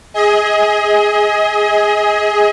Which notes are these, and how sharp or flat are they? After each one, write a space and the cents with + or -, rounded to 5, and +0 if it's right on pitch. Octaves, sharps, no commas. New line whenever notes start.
G#4 +0 D#5 +35